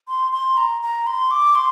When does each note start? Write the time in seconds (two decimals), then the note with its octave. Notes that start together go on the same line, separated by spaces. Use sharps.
0.08 C6
0.32 C6
0.57 A#5
0.82 A#5
1.07 C6
1.31 D6
1.55 C6